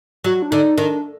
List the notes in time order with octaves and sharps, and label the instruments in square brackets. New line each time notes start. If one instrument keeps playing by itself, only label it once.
[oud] F#3 [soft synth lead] F#4
[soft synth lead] D4
[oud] D3 [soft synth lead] D#4
[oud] D#3 [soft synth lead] D4